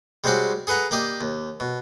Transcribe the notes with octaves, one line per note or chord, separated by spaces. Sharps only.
G3 G#3 C4 C#4 F#4 D5
G#4 A4 B4 F#5 A#5
A#3 G4 D5 D#5 G5
D#2
B2